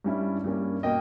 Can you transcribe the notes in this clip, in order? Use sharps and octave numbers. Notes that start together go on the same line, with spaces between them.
G2 G3 C#4 E4
G2 G3 A#3 C#4
B2 A#3 D#5 G5